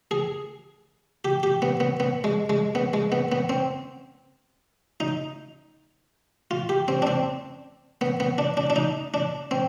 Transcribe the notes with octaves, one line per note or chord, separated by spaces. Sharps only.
G#4
G4
G4
B3
B3
B3
G#3
G#3
B3
G#3
B3
B3
C4
D#4
F4
G4
C4
D4
C4
B3
B3
D4
D4
D4
D#4
D4
C4